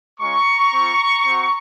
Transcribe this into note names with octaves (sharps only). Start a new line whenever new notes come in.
G#3 C#4 F4 A#5 C#6
C4 F4
C4 F#4